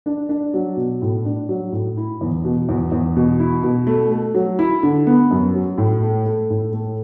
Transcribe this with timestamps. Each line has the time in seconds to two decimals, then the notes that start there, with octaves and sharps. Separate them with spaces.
0.06 D4
0.29 D4
0.54 F#3
0.77 B2
1.02 A2
1.25 D4
1.49 F#3
1.72 A2
1.97 E4
2.21 E2
2.45 B2
2.69 E2
2.92 E2
3.16 B2
3.40 E4
3.63 B2
3.87 A3
4.11 A3
4.34 F#3
4.59 E4
4.83 D3
5.07 B3
5.31 F#2
5.54 F#3
5.78 A2
6.03 A3
6.26 A3
6.50 A2
6.73 A3